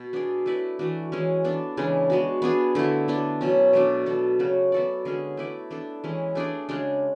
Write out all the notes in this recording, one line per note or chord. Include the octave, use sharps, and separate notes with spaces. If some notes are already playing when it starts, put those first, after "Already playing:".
Already playing: B2
B3 D4 G#4 D5
A3 E4 B4 D5
E3 A3 D4 F#4
E3 G#3 C#4
B3 D4 A4
C#3 E3 G#3 D4
G#3 B3 F#4
B3 D4 G#4
D3 A3 E4
B3 D4 A4
B2 F#3 C#4
B2 A3 D4
B3 D4 F#4 A4
C#3 F#3 B3 F#4
B3 F#4 A4 D5
D3 G#3 C#4 G#4
A3 E4 B4 D5
B3 D4 A4
E3 G#3 C#4
A3 D4 G#4 D5
C#3 G#3 D4